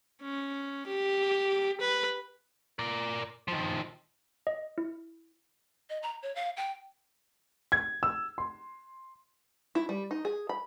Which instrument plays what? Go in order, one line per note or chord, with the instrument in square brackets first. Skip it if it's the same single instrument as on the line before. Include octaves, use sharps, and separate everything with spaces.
[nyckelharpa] C#4
G4
B4
[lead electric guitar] A#4 D5
D#3 F3
[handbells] D#5
E4
[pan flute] D#5
A#5
C#5
F5
G5
[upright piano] G#6
E6
C6
[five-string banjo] E4
G3
D#4
G#4
B5